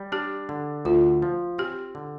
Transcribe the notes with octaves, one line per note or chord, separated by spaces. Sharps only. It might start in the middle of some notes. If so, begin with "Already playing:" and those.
Already playing: G3
D4 G4
D3
D2 F4
F3
C4 G4
D3